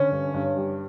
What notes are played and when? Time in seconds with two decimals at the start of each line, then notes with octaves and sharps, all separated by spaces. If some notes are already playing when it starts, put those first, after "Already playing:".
Already playing: D3 C#4
0.11 G2
0.34 G2
0.57 G3